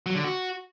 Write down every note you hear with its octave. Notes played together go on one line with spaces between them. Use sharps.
F#3
D3
F#4